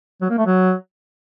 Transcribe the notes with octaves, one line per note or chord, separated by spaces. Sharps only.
F#3
A#3
A3
F#3